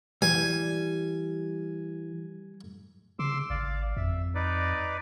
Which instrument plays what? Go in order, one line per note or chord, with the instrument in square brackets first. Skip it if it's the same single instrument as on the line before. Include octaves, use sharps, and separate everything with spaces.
[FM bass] E3 [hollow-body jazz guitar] G3 [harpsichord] G#5
[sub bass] C#3 [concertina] C6 D6 E6
[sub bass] G#1 [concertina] D5 F5
[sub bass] F2 [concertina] E5
[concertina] D#4 B4 D5